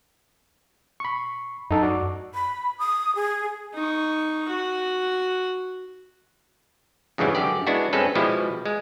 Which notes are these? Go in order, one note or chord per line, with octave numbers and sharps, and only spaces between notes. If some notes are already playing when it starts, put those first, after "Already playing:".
B5 C#6
F#2 D#4 A4
F#4 D5 D6
B5
D#6
G#4
D#4 C#6
F#4
F2 G#2 C#3 E3 F#3 G3
F#2 D3 G4 D5
G#3 B3 D4 E4 F#4
G2 G#3 C4 C#4 A4 B4
B2 F3 G3 G#3 E4
G#3